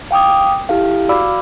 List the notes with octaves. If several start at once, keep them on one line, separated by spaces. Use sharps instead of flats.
F5 G5 D6 D#6
E4 G4 A4 F5
F#4 D5 F5 B5 D6 E6